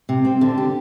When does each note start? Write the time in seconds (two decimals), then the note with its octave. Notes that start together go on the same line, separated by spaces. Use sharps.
0.09 C3
0.25 C4
0.41 D3
0.58 G4